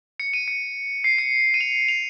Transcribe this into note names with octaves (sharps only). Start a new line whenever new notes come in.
C#7
D#7
C#7
C7
C#7
D#7
F7
F7